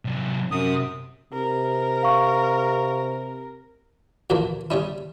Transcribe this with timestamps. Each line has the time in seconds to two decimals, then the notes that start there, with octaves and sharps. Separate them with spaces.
0.05 C3 F#3
0.51 F#2 C3 D#6
1.33 C3 A#4
2.03 F5 C#6
4.30 D2 A#2 E3 F3 A3 A#3
4.71 C#3 G3 C#4 E4